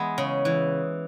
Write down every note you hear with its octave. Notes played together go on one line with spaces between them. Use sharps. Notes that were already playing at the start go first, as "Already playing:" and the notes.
Already playing: E3 G#3 B3
C#3
E3